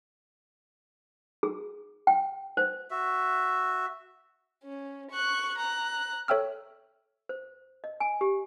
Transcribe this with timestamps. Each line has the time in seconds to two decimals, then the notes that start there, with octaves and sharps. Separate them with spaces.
1.43 G#4
2.07 G5
2.57 C5
2.90 F#4 E5
4.64 C#4
5.11 C#6 F#6
5.57 A#5 F#6
6.28 A4 C#5 E5 G5 E6 F6
7.29 C5
7.84 D#5
8.00 G#5
8.21 G4